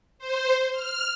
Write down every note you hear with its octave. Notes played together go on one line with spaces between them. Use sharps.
C5
F6